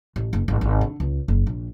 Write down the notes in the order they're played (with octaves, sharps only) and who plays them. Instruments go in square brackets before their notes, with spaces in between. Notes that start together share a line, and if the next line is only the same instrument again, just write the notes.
[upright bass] A1
F#1
G#1
G#1
D3
C#2
F#1
A#1